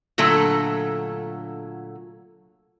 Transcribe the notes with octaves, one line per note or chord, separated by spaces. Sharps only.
A#2 D3 F#3 A3 A4